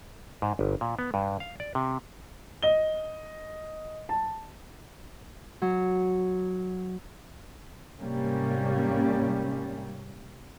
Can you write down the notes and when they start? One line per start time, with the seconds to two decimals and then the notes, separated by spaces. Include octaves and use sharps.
0.42 G#2
0.59 G1
0.81 A#2
0.99 B3
1.14 G2
1.40 F5
1.60 D5
1.75 C3
2.63 D#5 G7
4.09 A5
5.62 F#3
7.99 G#2 C3 G3 A#3 C#4